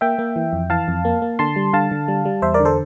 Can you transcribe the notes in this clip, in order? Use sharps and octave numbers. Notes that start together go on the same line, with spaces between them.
A#3 E5 G5
A#3
E3
F2
E3 F5 A5
F2
A#3
A#3
D3 A5 C6
G3
D3 F5 A5
D3
G3
G3
E2 C5 E5
A#4 D5
D3
A4 C5